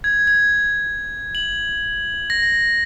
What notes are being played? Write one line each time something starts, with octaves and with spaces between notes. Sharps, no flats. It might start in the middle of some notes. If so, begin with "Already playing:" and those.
G#6
G#6
F#7
A#6